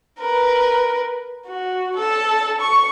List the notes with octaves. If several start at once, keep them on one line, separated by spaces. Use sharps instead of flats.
A#4 B4
F#4
A4 A5
C#6